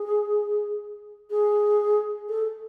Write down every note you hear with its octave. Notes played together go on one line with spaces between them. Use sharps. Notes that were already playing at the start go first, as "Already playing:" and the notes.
Already playing: G#4
G#4
A4